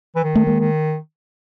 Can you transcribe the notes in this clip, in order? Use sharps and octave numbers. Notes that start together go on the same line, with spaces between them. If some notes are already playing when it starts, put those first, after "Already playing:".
E3
D#3
A3
G#3 A#3
D#3